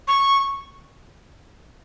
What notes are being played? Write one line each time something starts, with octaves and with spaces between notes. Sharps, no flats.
C#6